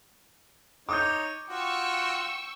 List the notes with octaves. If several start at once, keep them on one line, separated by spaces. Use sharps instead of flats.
D#4 C#5 D6 D#6 G6
F4 F#4 G5 C#6 E6